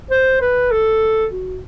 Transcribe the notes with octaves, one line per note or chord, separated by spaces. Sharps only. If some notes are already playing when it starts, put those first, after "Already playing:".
C5
B4
A4
F#4